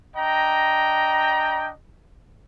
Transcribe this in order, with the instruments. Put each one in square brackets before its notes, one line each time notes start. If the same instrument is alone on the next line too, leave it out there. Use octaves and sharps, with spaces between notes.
[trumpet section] D4 D#5 G5 A#5